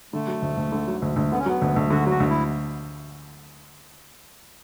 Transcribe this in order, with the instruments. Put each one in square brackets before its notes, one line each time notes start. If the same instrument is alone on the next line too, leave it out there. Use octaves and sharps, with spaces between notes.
[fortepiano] D3 [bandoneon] A3
[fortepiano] F#3
D2
D2
D3
F#3
D2
D2
[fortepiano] D3 [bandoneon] B3
[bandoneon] C#4
[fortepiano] F#3 [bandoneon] B3
[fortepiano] D2
D2
[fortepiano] D3 [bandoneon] F#4
[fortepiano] F#3 [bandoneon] F#4
[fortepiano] D2
[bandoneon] E4